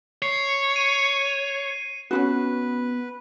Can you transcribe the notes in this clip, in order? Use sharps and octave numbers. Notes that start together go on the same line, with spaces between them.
C#5 C7
D#7
B3 C#4 F4 F#4 B4